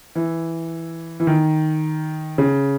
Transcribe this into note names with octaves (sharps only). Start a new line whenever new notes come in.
E3
E3
D#3
C#3